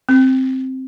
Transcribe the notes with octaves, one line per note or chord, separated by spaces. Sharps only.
C4